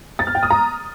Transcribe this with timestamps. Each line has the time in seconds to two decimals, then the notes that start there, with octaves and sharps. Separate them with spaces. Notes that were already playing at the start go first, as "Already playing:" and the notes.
0.19 A6
0.27 F6
0.35 G5
0.43 D#6
0.50 A#5